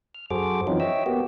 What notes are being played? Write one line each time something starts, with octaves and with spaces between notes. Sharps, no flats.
F6
F#2 F#4 G#4 A4 C5 D6
E3 F#3 C4 C#4 D#4 F4
C#5 D#5 E5 G5 E6
A#3 B3 F#4 G4